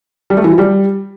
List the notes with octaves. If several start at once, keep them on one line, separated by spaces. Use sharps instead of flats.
G3
A3
E3
F3
G3